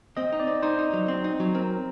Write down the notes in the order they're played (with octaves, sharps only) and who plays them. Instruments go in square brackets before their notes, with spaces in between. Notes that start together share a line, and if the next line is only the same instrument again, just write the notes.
[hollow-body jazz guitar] C4 [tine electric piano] D#5
[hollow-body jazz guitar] D#4
[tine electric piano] D5
[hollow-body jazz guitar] C4
[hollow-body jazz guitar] D#4 [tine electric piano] C5
[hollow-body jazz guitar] D#4
F#3
C4
D#4
F#3
[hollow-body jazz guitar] C4 [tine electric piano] A#4